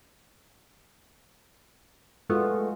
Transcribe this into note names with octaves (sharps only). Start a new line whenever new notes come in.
G#3 A3 B3 F4 F#4